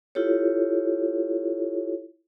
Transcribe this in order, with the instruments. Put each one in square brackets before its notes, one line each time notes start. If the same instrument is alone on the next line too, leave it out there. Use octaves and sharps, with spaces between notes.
[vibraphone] E4 F4 G4 A4 C#5